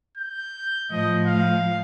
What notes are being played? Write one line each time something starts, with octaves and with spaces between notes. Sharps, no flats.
G6
A2 F3 D#5
F5